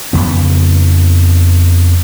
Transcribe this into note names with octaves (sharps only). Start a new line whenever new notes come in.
F2 C#3 B3